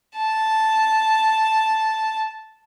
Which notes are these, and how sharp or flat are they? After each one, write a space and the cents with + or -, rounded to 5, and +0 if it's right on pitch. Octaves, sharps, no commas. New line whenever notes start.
A5 -5